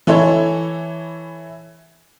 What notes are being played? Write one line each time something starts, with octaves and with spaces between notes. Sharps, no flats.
E3 E4 A4 C#5